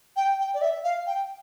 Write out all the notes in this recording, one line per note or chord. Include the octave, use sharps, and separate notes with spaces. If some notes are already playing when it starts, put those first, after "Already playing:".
G5
G5
D5
E5
F5
G5